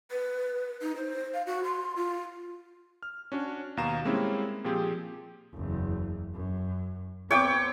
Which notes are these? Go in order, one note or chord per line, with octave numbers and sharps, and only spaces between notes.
B4
D#4
C5
F5
F#4
C6
F4
F6
C#4 D4 F#4 C#5
D#2 B2 F5 A#5 E7
G3 G#3 A#3 C4 C#4 E4
A#2 F3 C4 G4 G#4
F#1 E2
F#2
B3 C4 C#5 G5 D6